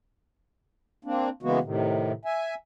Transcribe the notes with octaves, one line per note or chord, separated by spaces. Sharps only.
A#3 C4 D4
C#3 E3 G#3 A#3 B3 F#4
A2 C3 D#3
E5 G#5